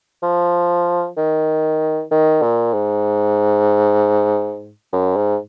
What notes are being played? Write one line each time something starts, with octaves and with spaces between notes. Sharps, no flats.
F3
D#3
D#3
A#2
G#2
F#2
G#2